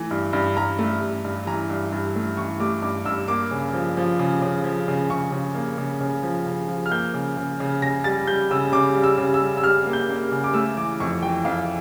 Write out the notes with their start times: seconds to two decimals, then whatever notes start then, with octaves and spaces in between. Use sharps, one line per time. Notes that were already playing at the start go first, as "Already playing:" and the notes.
Already playing: E3 A3
0.11 G2
0.33 G2
0.57 G2 A#5
0.79 A3
1.02 G2
1.25 G2
1.47 E3 A#5
1.70 G2
1.92 G2
2.16 A3
2.37 E3 C#6
2.60 A3 D6
2.83 G2 D6
3.06 G2 E6
3.28 A#3 D6
3.51 C#3
3.74 F3
3.97 F3
4.19 C#3
4.42 C#3
4.64 F3
4.88 C#3
5.10 C#3 C#6
5.32 C#3
5.55 A#3
5.78 C#3
6.00 C#3
6.23 F3
6.46 C#3
6.69 F3
6.86 F6
6.92 A#3 G6
7.14 C#3
7.37 C#3
7.60 C#3
7.82 C#3 A#6
8.04 G3 A6
8.27 G3 G6
8.51 C#3 E6
8.72 C#3 D6
8.95 G3
9.03 E6
9.18 C#3
9.34 E6
9.40 G3
9.57 E6
9.63 G3 F6
9.87 A#3
9.93 G6
10.09 A#3
10.32 C#3
10.44 D6
10.54 A3 E6
10.77 E3 D6
11.00 F2 C#6
11.22 E3 G5
11.45 F2 F5